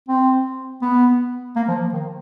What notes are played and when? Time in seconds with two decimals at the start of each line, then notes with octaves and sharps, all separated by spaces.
0.08 C4
0.82 B3
1.56 A#3
1.68 F3
1.93 D#3